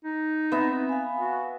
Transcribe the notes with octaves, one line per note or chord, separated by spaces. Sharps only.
D#4
B3 C4 E5
F5 G#5
F#4